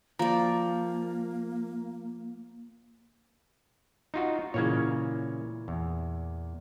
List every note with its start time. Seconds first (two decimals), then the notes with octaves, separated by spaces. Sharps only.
0.19 F3 A#3 D5 A#5
4.14 D#4 F4 F#4
4.54 A#2 C#3 E3 A#3 C#5 G#6
5.68 E2